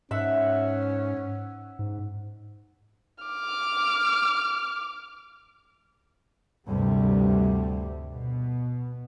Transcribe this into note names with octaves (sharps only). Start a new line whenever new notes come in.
G#2 C#4 E5 F#5
G#2
D6 F6
D2 G2 C3 G3
B2